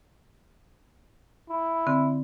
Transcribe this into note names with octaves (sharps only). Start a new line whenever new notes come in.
E4
D3 C4